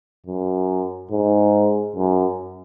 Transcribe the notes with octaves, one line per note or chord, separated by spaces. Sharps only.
F#2
G#2
F#2